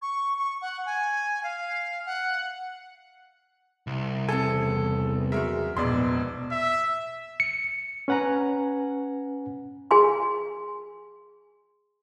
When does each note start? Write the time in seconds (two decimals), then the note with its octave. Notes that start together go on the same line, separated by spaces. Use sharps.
0.02 C#6
0.37 C#6
0.62 F#5
0.86 G#5
1.44 F5
2.06 F#5
3.87 C2
4.29 E2 C#3 C4 A4 G#5
5.32 C#2 F#2 G#3 F#4 A#4 E5
5.77 E1 A#1 E2 G#2 B2 D5 C6
6.52 E5
7.40 C#7
8.08 C#4 B4 F#5 G#5 A#5
9.91 G#4 G#5 C6